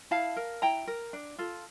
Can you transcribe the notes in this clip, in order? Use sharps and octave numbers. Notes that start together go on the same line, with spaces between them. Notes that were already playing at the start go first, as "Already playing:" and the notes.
E4 F5 A5
A#4
E4 G5 A#5
A#4
D4
F4 A4